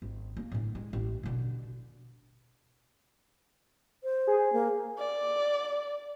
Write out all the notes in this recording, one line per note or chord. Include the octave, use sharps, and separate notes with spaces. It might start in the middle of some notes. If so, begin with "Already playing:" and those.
G#1
A#3
A2 D3
G#3
A1
B2 D3
C5
G#4
A#3
D5